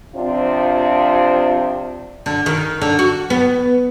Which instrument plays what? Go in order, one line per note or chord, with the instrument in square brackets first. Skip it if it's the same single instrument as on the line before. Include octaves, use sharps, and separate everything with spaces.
[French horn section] C3 F3 C4 D4 F4
[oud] D3
D#3
D3
F#4
B3